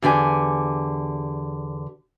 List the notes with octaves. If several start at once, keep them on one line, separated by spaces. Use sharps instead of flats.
E2 D3 G4 G#5